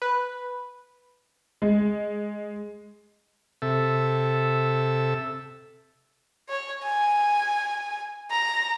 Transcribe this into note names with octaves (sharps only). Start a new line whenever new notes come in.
B4
G#3
C3 A4 E5
C#5
G#5
A#5